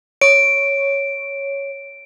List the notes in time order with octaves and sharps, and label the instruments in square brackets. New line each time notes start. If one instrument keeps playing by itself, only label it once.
[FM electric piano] C#5 [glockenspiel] D7